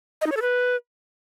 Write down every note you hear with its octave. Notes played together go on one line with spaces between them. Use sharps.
D#5
D#4
C#5
A4
B4